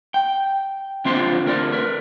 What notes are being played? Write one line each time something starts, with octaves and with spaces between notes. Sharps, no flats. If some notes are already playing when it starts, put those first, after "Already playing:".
G5
D3 C4 D4 F4 C5 C6
D2 A#4 D5
A#4 B4